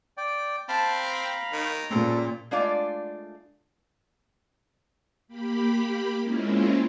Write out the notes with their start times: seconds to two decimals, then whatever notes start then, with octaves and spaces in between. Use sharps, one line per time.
0.17 D5 G5
0.69 C4 F5 A5 B5
1.00 A#5
1.52 D#3
1.91 A#2 C#3 C4 A4
2.51 G#3 A3 D4 F4 D5 F5
5.28 A#3 G4 B5
6.21 G#3 A#3 C4 C#4 E4 F4